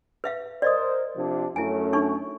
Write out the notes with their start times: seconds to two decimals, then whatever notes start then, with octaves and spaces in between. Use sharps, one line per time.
0.24 B4 E5 F5
0.62 A#4 C5 D5 D#5 D#6
1.16 C3 F3 D4
1.56 F#2 A3 C#4 E4 G#5
1.93 D4 D#4 C#6